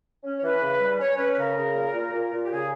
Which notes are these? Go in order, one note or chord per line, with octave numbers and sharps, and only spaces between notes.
C#4
C#5
E3 B4
C#3
G3
C#4 C#5
C#4 B4
B4
C#3 A#4
C#3
A#2
A#2
A#2
A#2
G4
C#3 G#4